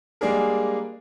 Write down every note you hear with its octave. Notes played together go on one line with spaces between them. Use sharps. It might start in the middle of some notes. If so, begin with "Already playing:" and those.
G3 G#3 A#3 D4 G#4 A#4